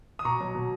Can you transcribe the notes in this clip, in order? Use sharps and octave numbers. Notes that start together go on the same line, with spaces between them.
D#6
B2 A#5 C#6
F#3
B2